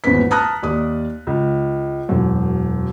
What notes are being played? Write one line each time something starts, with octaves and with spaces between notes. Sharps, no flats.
G#1 E2 A#2 C#4 B4 B6
A5 A#5 D#6 F6 F#6 A#6
D#2 D5 D#6
C#2
E1 F#2